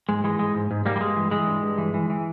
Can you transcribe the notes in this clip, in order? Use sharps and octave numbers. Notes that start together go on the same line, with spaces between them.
G#2 G#3
E3 G#3
G#2 G#3
G#2
G#2
G#2 G3 A#3
G3
G2 G#3
E3
E3 G#3
G2
G2
E3
E3
E3